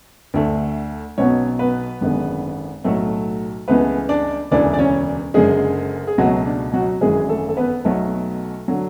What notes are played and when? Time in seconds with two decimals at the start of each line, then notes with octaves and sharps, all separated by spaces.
0.34 D2 D3 A3
1.18 B1 B2 F#3 B3 C#4 C#5
1.59 B3 B4
2.01 G#1 F#2 D3 G#3 B3
2.84 B1 A2 F#3 A3 A4
3.68 C#2 C#3 E3 A3 B3 B4
4.09 D4 D5
4.51 E1 D2 C#3 E3 D4 D5
4.73 D5
4.79 C#4 C#5
5.34 F#1 F#2 D3 G#3 G#4
6.07 G#4
6.18 C#2 B2 F#3 A3 F#4
6.46 D4
6.73 F#3 F#4
7.01 G#1 F#2 E3 G#3 G#4
7.29 A3 A4
7.49 A4
7.57 B3 B4
7.85 B1 B2 F#3 A3 B3 A4
8.68 D3 F#3